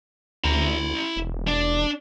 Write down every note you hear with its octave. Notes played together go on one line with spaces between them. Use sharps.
D2 E4 A#5
E1
D4